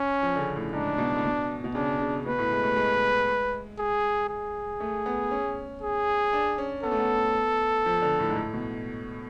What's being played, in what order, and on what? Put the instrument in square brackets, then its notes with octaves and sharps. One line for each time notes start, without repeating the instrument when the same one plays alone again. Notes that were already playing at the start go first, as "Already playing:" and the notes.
Already playing: [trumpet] C#4
[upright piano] F3
D3
C#3
A2
[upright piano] G#2 [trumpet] D4
[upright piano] B2
A2
B2
B2
[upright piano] C#3 [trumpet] D4
[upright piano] C#3
[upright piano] B2 [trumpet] B4
[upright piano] A2
G#3
A3
G#3
[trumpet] G#4
G#4
[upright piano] A3
B3
C#4
[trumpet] G#4
[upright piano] D4
C#4
[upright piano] B3 [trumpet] A4
[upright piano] A3
B3
F3
D3
A2
G#2
A2
B2